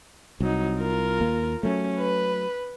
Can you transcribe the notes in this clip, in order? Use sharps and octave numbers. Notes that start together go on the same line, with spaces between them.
C2 F#3 D#4
F4 A#4
D#2 A#3
F#3 A3 C#4
B4